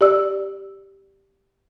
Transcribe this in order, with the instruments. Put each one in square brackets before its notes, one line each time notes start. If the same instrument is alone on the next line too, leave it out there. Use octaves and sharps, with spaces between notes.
[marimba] G4 D5 E6